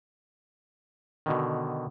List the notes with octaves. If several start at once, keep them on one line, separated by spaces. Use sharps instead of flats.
B2 D3 D#3